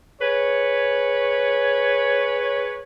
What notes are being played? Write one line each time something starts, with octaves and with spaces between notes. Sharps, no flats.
G#4 B4 C#5